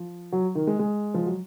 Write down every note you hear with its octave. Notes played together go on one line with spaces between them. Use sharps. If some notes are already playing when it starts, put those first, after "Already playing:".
Already playing: F3
F#3
D#3
G#3
G#3
F3
F#3